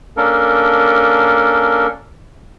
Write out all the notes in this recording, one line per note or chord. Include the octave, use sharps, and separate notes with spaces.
A#3 C#4 D4 A4 A#4